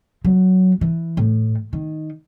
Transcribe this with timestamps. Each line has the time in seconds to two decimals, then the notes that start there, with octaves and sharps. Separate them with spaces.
0.25 F#3
0.81 E3
1.17 A2
1.73 D#3